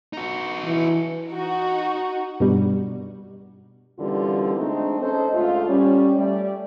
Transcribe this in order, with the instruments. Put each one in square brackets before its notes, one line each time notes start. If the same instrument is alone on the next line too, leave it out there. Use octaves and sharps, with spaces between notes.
[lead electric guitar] D#4 F#4
[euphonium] E3
[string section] D#4 F#4
[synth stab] G2 B2 G3
[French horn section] F#2 B2 D3 E3 G3 F4
G#3 A3 C4 D4 D#4
C#4 A4 C5 D#5
D2 G#2 A3 F4
G3 C#4
G3 A3 D5